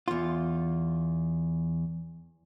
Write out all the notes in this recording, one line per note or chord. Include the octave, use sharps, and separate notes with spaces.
E2 F4